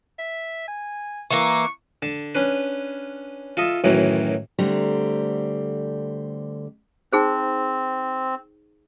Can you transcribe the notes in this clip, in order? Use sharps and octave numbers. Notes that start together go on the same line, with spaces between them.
E5
G#5
E3 A#3 C#6
D3 A5
C#4 D4 B4
F4 A4 D#5 E5
F#2 A2 D#3 E3 F#3
D2 D3 G3 A3 C4 A#5
C4 D#4 G#4 C5